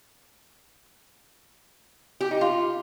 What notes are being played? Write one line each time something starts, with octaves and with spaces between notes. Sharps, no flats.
G4
D#4
F4